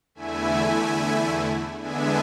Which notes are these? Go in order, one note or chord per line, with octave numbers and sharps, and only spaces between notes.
E2 D3 A3 E4 E5 G#5
E2 D3 G#3 B3 D4 E5 G#5